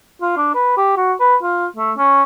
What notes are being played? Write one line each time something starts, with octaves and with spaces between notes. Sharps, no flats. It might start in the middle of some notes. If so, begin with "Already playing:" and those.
F4
D4
B4
G4
F#4
B4
F4
A3
C#4